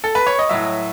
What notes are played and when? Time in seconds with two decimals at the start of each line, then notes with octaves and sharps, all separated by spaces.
0.04 A4
0.15 B4
0.27 C#5
0.39 D#5
0.49 A2 F#3 E5